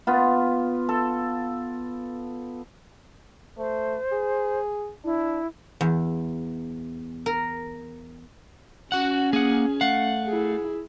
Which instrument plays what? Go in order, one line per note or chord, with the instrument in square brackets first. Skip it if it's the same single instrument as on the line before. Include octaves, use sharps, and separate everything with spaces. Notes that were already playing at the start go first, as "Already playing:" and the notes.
[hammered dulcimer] B3 F4
A4
[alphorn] A3 [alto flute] C5
[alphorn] G#4
[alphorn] D4 [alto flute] E4
[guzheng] E2
A#4
[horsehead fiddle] C#4 [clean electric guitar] F#4 F#5
[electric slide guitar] A#3 F#5 [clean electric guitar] G#4
[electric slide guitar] A3 F5 [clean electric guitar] F#5
[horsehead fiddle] E4 G#4